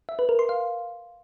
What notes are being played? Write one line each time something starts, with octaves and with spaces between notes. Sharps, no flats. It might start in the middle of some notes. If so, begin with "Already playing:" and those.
E5
B4
A#4
C6
F5